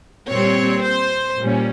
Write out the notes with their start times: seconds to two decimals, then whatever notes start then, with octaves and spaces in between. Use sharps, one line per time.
0.28 A#2 G3 C4 C#5
0.83 C5
1.39 A#2 G3 C#4